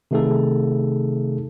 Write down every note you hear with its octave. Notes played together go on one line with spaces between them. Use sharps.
C3 D#3 A3 D#4 G#4 A4